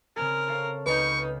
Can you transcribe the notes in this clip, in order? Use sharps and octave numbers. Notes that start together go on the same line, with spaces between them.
C#3 C4 G#4 A#4
A4 C#5 F5
C#2 D#4 B4 C#6 F6 G6